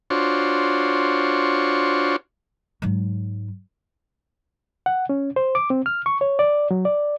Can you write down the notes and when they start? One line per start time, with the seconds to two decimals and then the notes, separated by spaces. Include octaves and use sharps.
0.10 D4 F4 F#4 C5 C#5
2.82 G#2 F#3
4.86 F#5
5.09 C#4
5.36 C5
5.55 D6
5.70 C4
5.86 F6
6.06 C#6
6.21 C#5
6.39 D5
6.71 F#3
6.85 D5